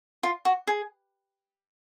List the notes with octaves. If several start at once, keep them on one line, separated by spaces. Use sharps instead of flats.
F4
F#4
G#4